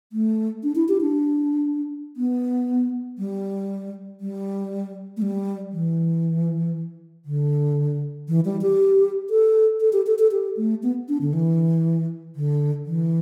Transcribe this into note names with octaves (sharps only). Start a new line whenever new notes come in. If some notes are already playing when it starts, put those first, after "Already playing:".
A3
D4
E4
G4
D4
B3
G3
G3
A3
G3
E3
D3
E3
G3
G4
A4
A4
G4
A4
A4
G4
A3
B3
D4
D3
E3
D3
E3